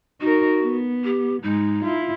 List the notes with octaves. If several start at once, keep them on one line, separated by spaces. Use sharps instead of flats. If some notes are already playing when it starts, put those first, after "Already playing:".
D#4 F#4 A#4
B3
G4
G#2 G#3 D#4
E4 F4